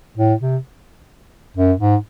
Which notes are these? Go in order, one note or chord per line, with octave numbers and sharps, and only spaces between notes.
A2
C3
F#2
G#2